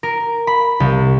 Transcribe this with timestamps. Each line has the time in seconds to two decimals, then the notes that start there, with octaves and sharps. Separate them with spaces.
0.03 A#4
0.47 B5
0.80 C2